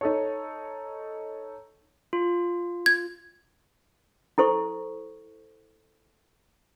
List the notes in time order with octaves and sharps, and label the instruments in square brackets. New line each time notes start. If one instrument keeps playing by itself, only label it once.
[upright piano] D#4 A4 C#5
[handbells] F4
[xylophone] G#6
[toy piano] E4 A4 C5 C#6